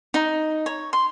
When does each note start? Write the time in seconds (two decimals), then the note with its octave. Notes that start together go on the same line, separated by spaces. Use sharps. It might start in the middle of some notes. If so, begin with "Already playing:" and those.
0.14 D#4
0.66 C#5
0.93 C6